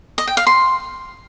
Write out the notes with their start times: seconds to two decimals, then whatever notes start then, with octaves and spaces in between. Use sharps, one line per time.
0.18 D#5
0.27 G5
0.37 F5
0.47 C6